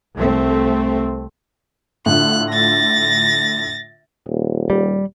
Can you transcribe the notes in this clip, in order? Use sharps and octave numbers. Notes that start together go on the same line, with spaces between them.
C2 A3 C4
A2 D3 F4 F#6
A6 A#6
D#1
G3